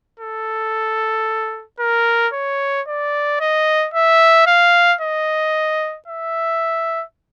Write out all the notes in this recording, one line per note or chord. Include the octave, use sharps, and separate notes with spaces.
A4
A#4
C#5
D5
D#5
E5
F5
D#5
E5